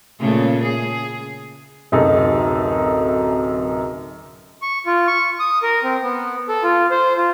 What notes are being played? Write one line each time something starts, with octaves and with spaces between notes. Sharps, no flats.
A#2 C#3 A3
G#4
D1 F#2 C3 D#4 G#4 A4
C#6
F4
C#6
D#6
A#4
C4
B3
A4
F4
C5
F4